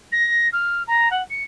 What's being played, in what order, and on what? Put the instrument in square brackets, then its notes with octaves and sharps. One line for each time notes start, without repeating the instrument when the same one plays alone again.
[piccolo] A#6
F6
A#5
F#5
C#7